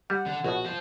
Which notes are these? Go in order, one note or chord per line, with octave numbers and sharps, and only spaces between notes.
G3 F#5
D3
A#1 B2 F#4
F4 C5